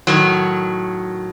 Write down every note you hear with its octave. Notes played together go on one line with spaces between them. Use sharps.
A2 D#3 F#3